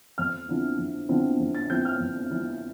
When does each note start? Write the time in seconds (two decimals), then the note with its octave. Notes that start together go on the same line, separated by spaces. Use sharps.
0.18 F2 F6
0.49 D3 F3 C4 E4
0.79 F2
1.09 D3 F3 C4 E4
1.40 F2
1.55 A6
1.69 D3 F3 C4 E4 G6
1.85 F6
2.00 F2
2.30 D3 F3 C4 E4